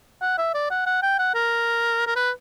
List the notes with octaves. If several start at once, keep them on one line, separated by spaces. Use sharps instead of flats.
F#5
E5
D5
F#5
F#5
G5
F#5
A#4
A#4
B4